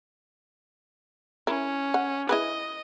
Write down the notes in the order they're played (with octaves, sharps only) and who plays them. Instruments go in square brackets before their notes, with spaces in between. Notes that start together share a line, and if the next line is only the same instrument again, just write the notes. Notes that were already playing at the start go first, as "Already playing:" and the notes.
[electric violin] C#4 [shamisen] E4 A#4
[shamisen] F#5
[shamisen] E4 G#4 B4 [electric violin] D#5